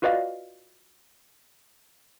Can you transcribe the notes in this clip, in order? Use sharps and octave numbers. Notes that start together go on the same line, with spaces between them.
F4 F#4 B4 D5 D#5 F5